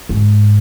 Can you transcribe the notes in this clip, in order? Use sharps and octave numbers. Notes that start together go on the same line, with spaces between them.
G#2